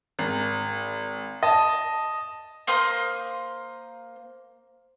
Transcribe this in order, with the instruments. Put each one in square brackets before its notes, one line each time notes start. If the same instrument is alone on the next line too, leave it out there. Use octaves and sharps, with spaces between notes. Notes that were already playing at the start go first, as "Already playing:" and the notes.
[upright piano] G#1
D#5 A5
[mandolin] A#3 C5 C6 D#6